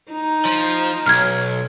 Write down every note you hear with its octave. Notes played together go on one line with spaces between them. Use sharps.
D#4 A#5
F3
B1 F6 G#6